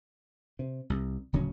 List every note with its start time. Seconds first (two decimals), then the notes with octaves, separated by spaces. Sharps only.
0.59 C3
0.90 C2
1.33 D1 C#3 F#3 C#4